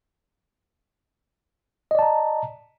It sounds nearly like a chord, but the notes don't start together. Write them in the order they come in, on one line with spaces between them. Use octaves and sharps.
D#5 D5 A5 A#5